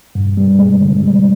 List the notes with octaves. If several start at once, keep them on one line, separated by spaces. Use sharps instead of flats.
G2
G3
G#3
D3
G3